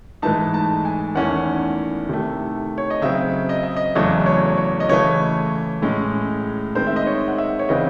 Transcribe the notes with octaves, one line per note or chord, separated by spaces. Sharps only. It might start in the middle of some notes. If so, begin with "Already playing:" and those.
G#2 E3 A3 D#4 A5
A5
G#5
E2 D#3 A3 C#4 E4 F#5
C3 D#3 A3
C#5
D#5
C#3 F#3 C4 E5
D#5
E5
D#5
E2 C#3 F#3 A3 C#5
C#5
C#5
D#5
C#3 E3 A3 C#5
A2 G#3 C#4
D#3 G#3 C4 C5
E5
D#5
C#5
F#5
E5
C#5
C#3 E3 C4 D#5